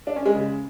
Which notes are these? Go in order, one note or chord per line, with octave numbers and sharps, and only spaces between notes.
D4
C#4
G#3
C#3